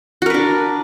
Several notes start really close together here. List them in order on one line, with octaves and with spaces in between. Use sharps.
F#4 A#4 B4 D4